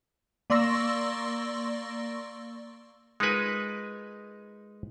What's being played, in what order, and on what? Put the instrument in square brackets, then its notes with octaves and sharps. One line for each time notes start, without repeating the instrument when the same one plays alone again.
[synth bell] A#3 D5 C6 C#6 E6 A#6
[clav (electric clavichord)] G#3 D#4 F4 A#4 B4 G#5